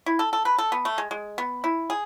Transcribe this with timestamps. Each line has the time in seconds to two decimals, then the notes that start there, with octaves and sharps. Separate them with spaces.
0.06 E4
0.19 A4
0.33 A4
0.45 B4
0.58 A4
0.72 B3
0.85 A3
0.98 G#3
1.11 G#3
1.38 B3
1.64 E4
1.90 G#4